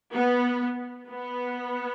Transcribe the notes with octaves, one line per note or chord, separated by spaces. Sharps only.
B3
B3